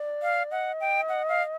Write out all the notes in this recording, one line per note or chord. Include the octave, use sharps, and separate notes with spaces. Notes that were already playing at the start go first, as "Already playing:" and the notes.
Already playing: D5
F5
D#5 F#5
G5
F#5
F5